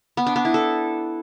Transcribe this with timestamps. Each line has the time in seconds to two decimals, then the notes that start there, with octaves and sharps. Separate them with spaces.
0.17 B3
0.27 D4
0.36 B3
0.45 E4
0.54 A4